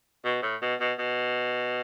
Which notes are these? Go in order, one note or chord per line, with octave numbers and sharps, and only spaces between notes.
B2
A2
B2
B2
B2